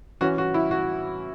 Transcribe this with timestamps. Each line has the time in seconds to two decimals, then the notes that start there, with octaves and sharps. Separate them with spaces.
0.21 E3 C#4 F#4
0.38 F#4
0.54 E4
0.71 F#4